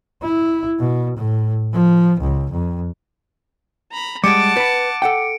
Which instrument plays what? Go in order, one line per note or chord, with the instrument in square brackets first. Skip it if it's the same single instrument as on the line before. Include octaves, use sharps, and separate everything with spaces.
[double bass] E4
B2
A2
F3
C#2
F2
[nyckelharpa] A#5 B5
[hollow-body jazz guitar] G3 G#3 [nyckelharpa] F#5 A5 [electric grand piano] D6 [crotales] C#7 D7
[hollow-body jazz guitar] B4 B5
A4 F#5 G5